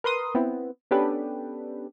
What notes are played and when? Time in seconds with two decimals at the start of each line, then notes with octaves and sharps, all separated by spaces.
0.04 A#4 B4 C6 D#6
0.35 B3 C4 E4
0.91 B3 C#4 D4 G4 A4 B4